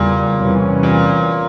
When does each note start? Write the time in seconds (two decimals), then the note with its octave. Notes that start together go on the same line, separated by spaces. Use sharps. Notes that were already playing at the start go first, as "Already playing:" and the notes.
Already playing: E2 A#2 C#3 G3
0.41 E2 C3 E3 G3 C#4
0.83 A#2